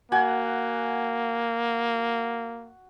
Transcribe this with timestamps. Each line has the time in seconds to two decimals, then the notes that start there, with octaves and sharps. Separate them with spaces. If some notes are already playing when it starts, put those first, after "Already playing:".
0.12 A#3 F#4 F#5 G#5